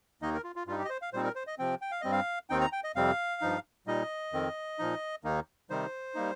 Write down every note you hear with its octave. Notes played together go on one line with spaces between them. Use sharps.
D#2 D#3 A#3 D#4 D#5
A#4
F4
F4
G2 G3 D#4 F4
G4
D#5
C5
F5
A#2 G3 C4 D#4 C5
A#4
C5
D#5
C3 F3 C4 G5
G5
F5
G2 G3 C4 D#5
F5
D#2 D#3 C4 D#4 G5
A#5
G5
D#5
F2 C3 G3 C4 F5
G2 F3 D#4
A#2 G3 D#4 D#5
F2 D#3 C4
A#2 F3 D#4
D#2 D#3 A#3 D#4
C3 D#3 G3 D#4 C5
G3 A#3 D#4